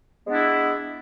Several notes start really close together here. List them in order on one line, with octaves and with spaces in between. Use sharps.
G#3 B3 D4 E4